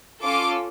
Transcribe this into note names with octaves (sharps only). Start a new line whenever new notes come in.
C#4 F4 A4 D6